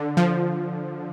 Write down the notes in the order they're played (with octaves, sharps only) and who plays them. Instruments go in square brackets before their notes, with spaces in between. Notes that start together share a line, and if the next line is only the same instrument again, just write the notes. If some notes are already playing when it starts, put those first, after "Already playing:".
Already playing: [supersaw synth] D3
F3